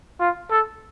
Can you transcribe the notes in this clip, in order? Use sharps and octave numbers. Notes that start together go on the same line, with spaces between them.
F4
A4